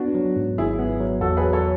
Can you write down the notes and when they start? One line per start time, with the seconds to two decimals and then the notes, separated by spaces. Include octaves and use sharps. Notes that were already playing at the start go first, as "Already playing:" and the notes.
Already playing: B3 D4 F#4
0.15 F#3
0.36 G#2
0.58 G#1 E4 G#4
0.79 B3
1.00 F#3
1.21 E2 F#4 A4
1.37 G#4 B4
1.42 F#3
1.53 A4 C#5